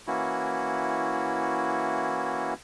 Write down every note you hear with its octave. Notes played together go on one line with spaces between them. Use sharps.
E3 A#3 C#4 E4 F#4